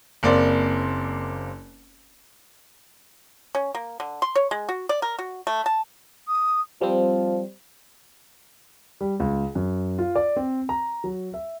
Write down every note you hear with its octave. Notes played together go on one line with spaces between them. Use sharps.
F#1 A#3 C4 D5
C#4
A#3
D3
C6
C#5
G#3
F#4
D5
A#4
F#4
A3
A5
D#6
F3 G3 C4
G3
C#2
F#2
F4
D5
C4
A#5
F#3
E5